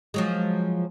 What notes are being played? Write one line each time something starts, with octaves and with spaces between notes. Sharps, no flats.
F3 F#3 G#3